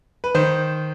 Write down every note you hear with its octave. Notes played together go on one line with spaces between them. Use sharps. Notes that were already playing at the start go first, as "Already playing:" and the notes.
B4
D#3 C5